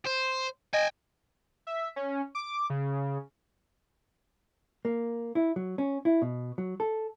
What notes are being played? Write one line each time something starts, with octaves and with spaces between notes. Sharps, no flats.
C5
D#5 G5 G#5
E5
C#4
D6
C#3
A#3
E4
F#3
C#4
E4
B2
F#3
A4